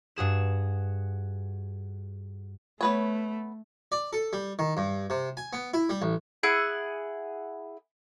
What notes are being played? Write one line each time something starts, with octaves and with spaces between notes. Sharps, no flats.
G2 F#4 G#4 E7
A3 B3 B4 C#5
D5
A4
G3
D#3
G2
C3
G#5
B3
E4
G3
A1
E4 G#4 F#5